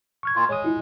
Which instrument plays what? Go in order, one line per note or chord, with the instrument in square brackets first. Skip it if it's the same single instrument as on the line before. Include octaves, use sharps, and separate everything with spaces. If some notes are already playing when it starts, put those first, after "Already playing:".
[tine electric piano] C#6 F6 G#6
[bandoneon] A#2 F4
[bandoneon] G#3 [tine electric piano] C#5 D#6
[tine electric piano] E4 F4